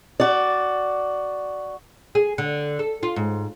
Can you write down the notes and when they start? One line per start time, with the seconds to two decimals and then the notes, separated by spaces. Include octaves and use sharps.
0.20 F#4 D5
2.15 G#4
2.38 D3
2.79 A4
3.03 F4
3.16 G#2